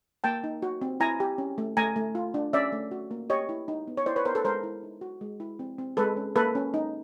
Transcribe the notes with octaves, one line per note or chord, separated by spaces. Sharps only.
A#3 G5 A5
D#4
F#4
C4
E4 G#5 A#5
G4
C#4
A3
A3 G#5 A#5
A3
F4
D4
C#4 D5 E5
A3
F#4
A#3
G4 C#5 D#5
E4
D#4
B3
C#5
E4 C5 D5
B4 C#5
B3 A#4 C5
A4 B4
G#3 A#4 C5
E4
D#4
F#4
G#3
E4
C4
C4
G#3 A4 B4
C#4
A#3 A4 B4
C#4
D#4